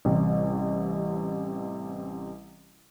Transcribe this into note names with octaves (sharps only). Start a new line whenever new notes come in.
A1 C3 G3